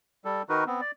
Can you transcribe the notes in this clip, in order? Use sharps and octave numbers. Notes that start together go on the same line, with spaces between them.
G3 A4
D#3 D#4 F#4 A#4 B4
B3 C4
D5